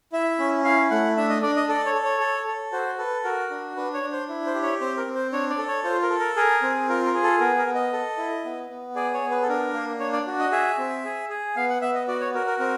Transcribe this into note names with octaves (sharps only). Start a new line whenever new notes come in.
E4 E5
C#4
E4 F5
A3 F#5
D4 E5
D#5
D4 D5
D#5
A4 D5
C#5
A4
C#5
A4
A4
F#4 C5
A4 B4
F#4 A#4
D4
D4 B4
C#5
D4
C5
E4
C5
G4
C#5
C4 C5
A#4
C4
C5
D4 C#5
D5
A4
C#5
F4 C5
A#4
A4
A#4
G#4 A#4
C4
F4 A#4
A#4
G#4
A4
B3 A#4
A#4
B3
D#5
A4
E4
B3
B3
G#4 D5
C#5
B3
B4
A4
D4 A#4
A#3
D4 C#5
D5
F#4
D#5
G#4 E5
C4
G#4
G#4
B3 F5
F#5
B3 E5
D#5
F#4 D5
C#5
F#4 A#4
A#4
C4 A#4